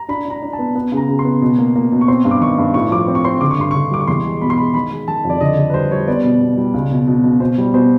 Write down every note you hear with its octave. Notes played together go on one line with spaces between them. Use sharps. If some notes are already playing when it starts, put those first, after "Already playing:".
Already playing: A#5
D4 B5
D4 A#5
D4
A5
B3
B3
C#3
A#5
C#3
C6
B3
B2
A#3
A#3
B2
C#6
C4 C6
G2
D6
D#3 C#6
G2
A2 C#6
F3 D6
C4
C#6
C4 C6
D3 D6
C#6
G2 C6
D3 C#6
G3 D6
C#6
E2 C6
G#3
B2 B5
C6
G#3 B5
D#3 B5
G#3
D#3 A5
F2
D5
D3 D#5
D3
B4
G3 C5
G3 C#5
B3 D5
B2
B2
G3
C#2
B2
B2
B2
B2 C5
G3
B2 C5